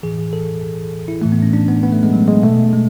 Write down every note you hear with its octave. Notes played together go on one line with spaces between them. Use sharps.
A2 E3 G#4
A4
E4
A2 E3 A3
B3
C#4
D4
B3
B3
A3
G#3
F#3
G#3
B2 A3
G#3